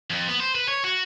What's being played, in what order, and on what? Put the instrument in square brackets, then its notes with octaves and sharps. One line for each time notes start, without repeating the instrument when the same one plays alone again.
[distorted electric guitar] F2
B3
C5
B4
C#5
F#4